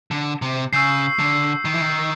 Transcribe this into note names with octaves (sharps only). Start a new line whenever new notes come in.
D3
C3
C#3 C#6 E6 G6 C7
D3
D#3
E3
D#3